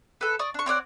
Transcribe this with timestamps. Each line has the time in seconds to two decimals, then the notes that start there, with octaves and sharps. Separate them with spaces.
0.21 A4 B4
0.39 D5 C#6 D#6
0.54 D4 C#6
0.66 C4 C#5 D5 F#5